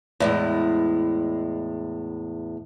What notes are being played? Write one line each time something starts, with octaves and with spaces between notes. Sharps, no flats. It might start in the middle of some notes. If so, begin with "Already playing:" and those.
E2 A2 G#3